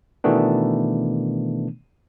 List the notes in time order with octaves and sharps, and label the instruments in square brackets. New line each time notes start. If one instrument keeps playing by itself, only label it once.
[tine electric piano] B2 D#3 E3 A3 B3 D4